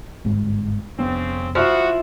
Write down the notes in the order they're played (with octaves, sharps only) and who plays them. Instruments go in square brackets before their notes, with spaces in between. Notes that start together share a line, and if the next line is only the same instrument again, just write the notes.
[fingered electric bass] G1 G#2 G#3
[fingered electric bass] F1 B3 D4 [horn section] C#3 C4
[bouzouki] F3 E4 [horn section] F#4